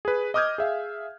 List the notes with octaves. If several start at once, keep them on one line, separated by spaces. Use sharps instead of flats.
G#4 B4
D#5 D6 D#6 F6 G6 G#6
G#4 E5 F5